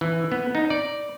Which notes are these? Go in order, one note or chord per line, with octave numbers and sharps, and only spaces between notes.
E3
B3
D#4
D5